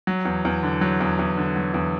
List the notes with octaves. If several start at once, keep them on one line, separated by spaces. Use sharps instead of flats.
F#3
E2
E2
D3
F#3
E2
E2
D3
F#3
E2